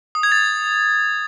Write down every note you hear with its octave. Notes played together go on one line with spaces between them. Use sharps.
D#6
G#6
A6